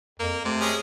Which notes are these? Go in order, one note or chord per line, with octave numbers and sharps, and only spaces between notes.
F2 A#3
C3 A3
G#3 C#4 G#4